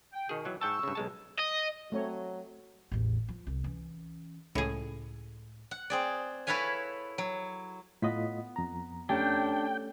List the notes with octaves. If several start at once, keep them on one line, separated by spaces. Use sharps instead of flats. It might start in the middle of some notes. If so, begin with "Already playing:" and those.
G5
B2 D#3 G#4
E3 F#3
G#2 G5 A5 C#6 E6
G2 C#3
B1 G#3 A5
D#5
F#3 A3 C4 C#5
A1 E2
F3
C2
E3 C#4
C#2 A2 G#4
F#5
C4 G#4 D5
E4 A4 B4 C#5 F5 G#5
F#3
A2 B3 F4 D#5 B6
F2 A#5
A3 C#4 D4 G4 G5